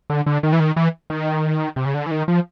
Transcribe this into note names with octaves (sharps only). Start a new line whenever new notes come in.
D3
D3
D#3
E3
D#3
E3
D#3
C3
C#3
D3
E3
D#3
F3